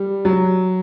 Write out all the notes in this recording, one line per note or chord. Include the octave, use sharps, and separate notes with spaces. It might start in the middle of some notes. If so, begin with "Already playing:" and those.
Already playing: G3
F#3